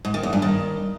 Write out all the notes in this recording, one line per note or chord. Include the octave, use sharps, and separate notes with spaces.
G#2
D#3
E2
G2
D#3